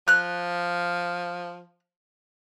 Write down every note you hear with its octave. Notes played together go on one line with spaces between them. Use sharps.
F3 F6 F#6